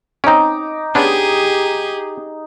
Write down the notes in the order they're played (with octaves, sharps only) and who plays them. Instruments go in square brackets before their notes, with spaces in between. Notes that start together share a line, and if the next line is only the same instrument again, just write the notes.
[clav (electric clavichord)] C4 C#4 [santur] D#4 D6
[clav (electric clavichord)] B3 C#4 D4 [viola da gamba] G4 G#4